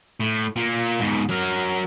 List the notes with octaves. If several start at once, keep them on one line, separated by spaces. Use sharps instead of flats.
A2
A#2 A#3
G#2 B2
F#3 A#4